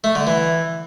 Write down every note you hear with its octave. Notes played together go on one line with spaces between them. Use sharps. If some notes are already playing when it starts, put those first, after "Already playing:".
A3
D3
E3